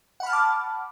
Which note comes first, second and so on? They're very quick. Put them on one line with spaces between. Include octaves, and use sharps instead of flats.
F#5 B5 F6 A5 D6